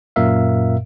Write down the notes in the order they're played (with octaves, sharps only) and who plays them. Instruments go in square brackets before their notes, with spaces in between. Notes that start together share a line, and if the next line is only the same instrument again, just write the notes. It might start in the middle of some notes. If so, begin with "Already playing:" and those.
[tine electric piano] F#2 A#2 A#4 E5 F5